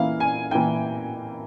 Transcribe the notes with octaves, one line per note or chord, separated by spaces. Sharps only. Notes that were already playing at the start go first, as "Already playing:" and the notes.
Already playing: E3 A#3 E4 F5
G#5
E3 A#3 E4 G5